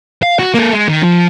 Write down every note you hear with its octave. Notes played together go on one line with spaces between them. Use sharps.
F5
F#4
A#3 A4
G#3
D#3
F3